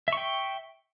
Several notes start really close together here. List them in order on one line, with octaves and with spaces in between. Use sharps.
E5 C#6 G5